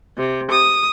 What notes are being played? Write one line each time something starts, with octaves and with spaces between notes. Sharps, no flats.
C3
D#6